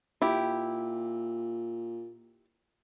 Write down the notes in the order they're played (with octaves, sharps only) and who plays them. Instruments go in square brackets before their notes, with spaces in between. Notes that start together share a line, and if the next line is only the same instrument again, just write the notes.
[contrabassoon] A#2 [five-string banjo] E4 G4